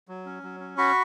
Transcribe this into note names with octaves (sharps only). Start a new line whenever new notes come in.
F#3
C#4
F#3
C#4
F#4 B5 C#6